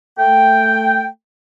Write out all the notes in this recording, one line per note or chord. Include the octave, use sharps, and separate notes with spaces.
A3 G5